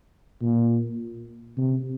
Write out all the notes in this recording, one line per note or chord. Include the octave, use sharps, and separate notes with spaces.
A#2
C3